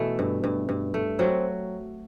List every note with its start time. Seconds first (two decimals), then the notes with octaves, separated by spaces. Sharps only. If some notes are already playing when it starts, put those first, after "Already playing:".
Already playing: B2 E3 A3 E4
0.19 G2
0.44 G2
0.69 G2
0.94 A3
1.19 F#3 C4 F#4